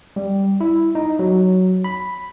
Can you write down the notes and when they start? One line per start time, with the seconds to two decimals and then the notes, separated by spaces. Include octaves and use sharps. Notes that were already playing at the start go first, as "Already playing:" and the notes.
0.16 G3
0.61 E4
0.95 D#4
1.19 F#3
1.84 B5